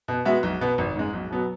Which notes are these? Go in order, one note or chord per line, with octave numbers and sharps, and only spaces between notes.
B2
G#3 B3 F#4 E5
B1
B2 B3
G#1
G#2 G#3
B1
B2 F#3 B3